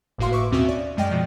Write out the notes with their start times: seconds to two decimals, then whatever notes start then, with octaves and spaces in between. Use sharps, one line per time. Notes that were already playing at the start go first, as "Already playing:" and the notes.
0.18 G1 A2 A#3 F#4 F5 C6
0.32 B4 E5 C#6 D6
0.51 D#2 B2 C4 C#4 F#4 E5
0.68 D5
0.97 F#2 G#3 D5 D#5 G5 F6
1.11 B2 F3